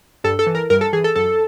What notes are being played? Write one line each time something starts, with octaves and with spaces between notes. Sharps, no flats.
G2 A4
A4
E3
A#4
G2 A#4
A4
E3 G#4
A4
F#2 A4